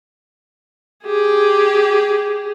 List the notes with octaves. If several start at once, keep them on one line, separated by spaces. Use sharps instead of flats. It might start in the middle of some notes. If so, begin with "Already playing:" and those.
G4 G#4